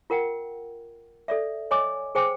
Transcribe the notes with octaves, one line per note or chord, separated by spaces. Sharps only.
F4 A#4 F#5 G5
A4 D5 E5
C#5 D#5 G#5 D6
G#4 C5 G5 G#5 D6